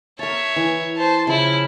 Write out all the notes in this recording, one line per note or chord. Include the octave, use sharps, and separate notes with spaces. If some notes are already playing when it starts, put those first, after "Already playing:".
A#4 C#5 E5 A5
E3
C5 A5
C#3 F3 E4